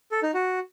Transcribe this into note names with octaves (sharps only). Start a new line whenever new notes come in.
A4
D#4
F#4